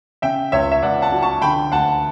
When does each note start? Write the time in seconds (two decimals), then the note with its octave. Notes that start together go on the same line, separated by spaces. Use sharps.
0.22 C#3 E5 G5
0.52 C#2 C#5 E5
0.71 E5
0.82 C#2 D5 F#5
1.02 F#5 A5
1.12 F#3
1.22 A5 C#6
1.42 D3 G5 B5
1.72 D2 F#5 A5